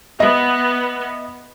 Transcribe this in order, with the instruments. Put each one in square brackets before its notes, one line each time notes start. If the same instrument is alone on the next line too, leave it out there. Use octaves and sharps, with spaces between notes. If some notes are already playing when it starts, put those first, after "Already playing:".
[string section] B3 [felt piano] D#5 E5